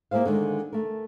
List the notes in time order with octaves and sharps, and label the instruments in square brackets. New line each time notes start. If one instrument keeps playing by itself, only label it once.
[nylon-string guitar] A#3 E4 G#4 C5 F5
D3 D#3 G#3
A3 A#4